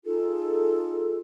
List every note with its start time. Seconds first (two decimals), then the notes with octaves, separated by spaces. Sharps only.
0.05 D#4 F4 G#4 A4